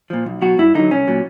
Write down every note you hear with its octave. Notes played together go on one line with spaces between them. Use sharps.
A#2 F3
B1
B2 F#3 F#4
G2 E4
D3 F#3 D#4
C2 C#4
A#2 F#3